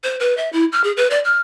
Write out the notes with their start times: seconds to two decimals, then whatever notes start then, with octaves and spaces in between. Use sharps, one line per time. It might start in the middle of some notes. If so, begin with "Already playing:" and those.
0.04 C5
0.20 B4
0.37 E5
0.53 E4
0.72 F6
0.84 G#4
0.97 B4
1.11 D5
1.24 F6